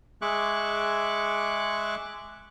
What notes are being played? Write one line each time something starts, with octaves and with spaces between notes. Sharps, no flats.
G#3 G#4 E5 C#6 D6 F#6